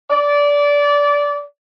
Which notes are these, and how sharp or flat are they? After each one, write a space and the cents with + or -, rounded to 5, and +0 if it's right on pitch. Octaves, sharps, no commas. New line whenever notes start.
D5 -20